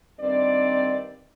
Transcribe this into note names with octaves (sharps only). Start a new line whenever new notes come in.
G2 D#3 C4 D5